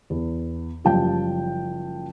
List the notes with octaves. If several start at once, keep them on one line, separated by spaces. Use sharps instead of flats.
E2
F#1 F3 G3 G5 A5